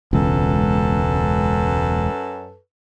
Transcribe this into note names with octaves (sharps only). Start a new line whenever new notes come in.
E1 C#2 F#2 A4 B4